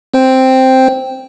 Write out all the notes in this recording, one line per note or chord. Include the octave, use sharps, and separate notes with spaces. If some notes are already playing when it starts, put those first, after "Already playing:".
C4 C5 G5